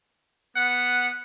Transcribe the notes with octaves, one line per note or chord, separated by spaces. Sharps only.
B3 F#5